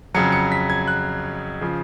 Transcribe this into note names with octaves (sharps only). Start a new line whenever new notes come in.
F2 C#3 F#3 C#7
C#7
B6
G#6
F#6
C#3 F3